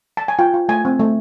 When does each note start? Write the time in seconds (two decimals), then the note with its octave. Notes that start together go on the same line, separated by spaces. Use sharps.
0.17 A5
0.28 G#5
0.39 F4 G5
0.54 F4
0.69 A3 G#5
0.85 C4
1.00 A3